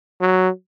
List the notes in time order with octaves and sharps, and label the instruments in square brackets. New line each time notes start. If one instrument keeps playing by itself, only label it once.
[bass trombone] F#3